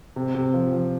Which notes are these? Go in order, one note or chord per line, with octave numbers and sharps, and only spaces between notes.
C3
C3
F3
F3